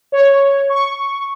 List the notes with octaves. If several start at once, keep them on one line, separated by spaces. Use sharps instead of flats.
C#5
C#6